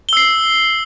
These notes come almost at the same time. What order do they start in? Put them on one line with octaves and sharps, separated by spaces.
G7 E6 C7